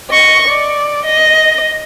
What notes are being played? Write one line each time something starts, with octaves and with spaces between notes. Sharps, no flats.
D#5 C#6
D5
D#5